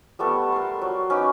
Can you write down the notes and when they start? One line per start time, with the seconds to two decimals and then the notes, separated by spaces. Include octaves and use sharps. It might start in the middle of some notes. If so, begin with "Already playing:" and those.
0.19 G3 A3 B3 A4
0.52 A#4 C6
0.82 F#3
1.10 C#4 D#4 B4 D5